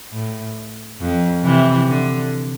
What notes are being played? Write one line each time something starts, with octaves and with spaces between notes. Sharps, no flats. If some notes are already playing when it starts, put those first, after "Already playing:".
A2
F2
C3 E3
D3